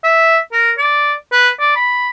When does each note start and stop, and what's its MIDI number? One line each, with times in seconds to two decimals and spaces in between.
0.04 0.38 76
0.53 0.72 70
0.78 1.13 74
1.32 1.49 71
1.60 1.71 74
1.76 2.08 83